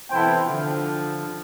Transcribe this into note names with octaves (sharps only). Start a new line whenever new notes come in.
C3 E3 B3 E4 A4 C5 G5
D3 F3